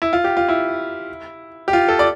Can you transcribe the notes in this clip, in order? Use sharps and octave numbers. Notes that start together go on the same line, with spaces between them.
E4
F4
G4
F4
E4
G4
F4
A4
D5